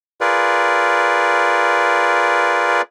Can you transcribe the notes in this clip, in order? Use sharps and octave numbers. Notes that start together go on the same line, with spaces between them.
F4 G#4 A#4 B4 D5